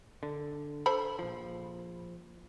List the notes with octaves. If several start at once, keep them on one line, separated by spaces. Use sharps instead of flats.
D3
A4 C5 B5
A#1 F3